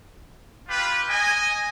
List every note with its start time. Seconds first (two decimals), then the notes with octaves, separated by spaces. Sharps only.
0.68 F4 G4 B4
1.08 D#5 G#5